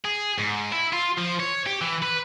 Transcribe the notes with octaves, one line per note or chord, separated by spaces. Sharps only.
G#4
G#2
E4
F4
F3
C#5
G4
E3
B4